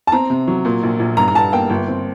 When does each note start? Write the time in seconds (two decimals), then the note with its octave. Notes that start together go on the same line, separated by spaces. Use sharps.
0.07 A5
0.12 C4 A#5
0.30 C3
0.47 F#3
0.65 A#2
0.83 A#1
0.99 A#1
1.17 G2 A#5
1.28 A#5
1.35 G2 A5
1.52 A#3 G5
1.70 G1
1.88 C4